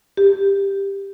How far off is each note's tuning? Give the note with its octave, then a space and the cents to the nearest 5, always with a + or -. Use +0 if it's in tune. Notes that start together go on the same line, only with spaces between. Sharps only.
G4 +10